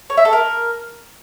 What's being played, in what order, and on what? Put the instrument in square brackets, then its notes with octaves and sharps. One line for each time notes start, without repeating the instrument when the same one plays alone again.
[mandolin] C#5
E5
A4
A#4